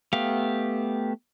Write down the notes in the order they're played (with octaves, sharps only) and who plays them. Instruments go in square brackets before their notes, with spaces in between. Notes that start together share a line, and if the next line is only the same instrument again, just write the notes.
[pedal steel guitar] A3 B3 G4 F5